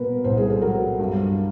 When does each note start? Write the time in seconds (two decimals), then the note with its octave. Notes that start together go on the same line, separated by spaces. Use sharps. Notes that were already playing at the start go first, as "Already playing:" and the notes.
Already playing: B2 A#3 A#4 B4
0.24 C2 C5
0.37 G#4
0.50 A4
0.61 F#3 A#4
1.00 G2